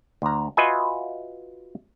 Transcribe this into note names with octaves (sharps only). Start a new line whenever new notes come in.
D2 A#5
F4 F#4 B4 D#5 E5 G#5